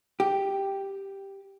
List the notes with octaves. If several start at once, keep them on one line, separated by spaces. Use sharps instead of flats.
G4